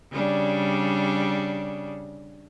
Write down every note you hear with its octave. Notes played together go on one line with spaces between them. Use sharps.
C#3 G3 D4